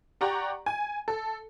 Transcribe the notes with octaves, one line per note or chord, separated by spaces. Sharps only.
G4 D5 F#5 A#5 C#6
G#5
A4